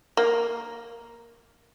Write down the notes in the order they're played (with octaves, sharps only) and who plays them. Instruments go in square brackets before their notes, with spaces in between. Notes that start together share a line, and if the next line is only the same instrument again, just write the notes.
[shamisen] A#3